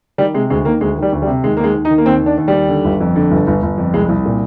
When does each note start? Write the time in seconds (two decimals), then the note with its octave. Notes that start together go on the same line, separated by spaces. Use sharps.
0.18 D#3 G3
0.34 C3 G#3
0.50 D2 G#3
0.65 D#3 A#3
0.81 D2 G#3
0.97 D#3
1.02 G3
1.12 D2
1.22 G3
1.27 C3
1.44 D#2 G#3
1.57 A#3
1.60 D#2 G#3
1.74 D#2
1.85 D#4
1.90 D#3
1.98 A#3
2.06 D#2 C4
2.22 D#3 D4
2.38 D#2
2.48 G3
2.53 D#2
2.68 D3
2.85 G1
3.00 F2
3.16 D3
3.31 G1
3.47 G1
3.62 G1
3.78 F2
3.94 C2 G#3
4.09 C2
4.25 A#2